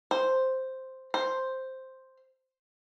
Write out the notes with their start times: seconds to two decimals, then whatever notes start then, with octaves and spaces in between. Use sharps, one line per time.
0.11 C5
1.14 C5